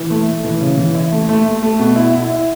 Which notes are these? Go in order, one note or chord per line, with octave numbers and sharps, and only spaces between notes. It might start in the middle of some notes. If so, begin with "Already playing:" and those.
Already playing: E3
A3
A3
E3
C#3
E3
E4
A3
A3
A3
A3
B2
E4
E4
E4